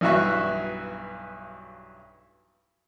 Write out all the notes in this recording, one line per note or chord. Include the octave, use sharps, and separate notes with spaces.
B1 G2 E3 F#4 E5 C#6